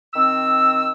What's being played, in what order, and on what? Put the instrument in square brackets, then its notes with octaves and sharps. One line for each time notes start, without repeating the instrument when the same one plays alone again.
[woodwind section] D#3 C4 E6